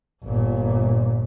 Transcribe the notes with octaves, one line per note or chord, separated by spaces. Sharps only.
G1 A#2